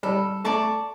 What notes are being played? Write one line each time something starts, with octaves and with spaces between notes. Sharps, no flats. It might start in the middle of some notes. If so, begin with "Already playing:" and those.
G3 A4
A3 D5 A5 C#6